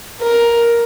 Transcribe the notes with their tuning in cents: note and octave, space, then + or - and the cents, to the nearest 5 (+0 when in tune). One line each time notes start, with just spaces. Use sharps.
A#4 +10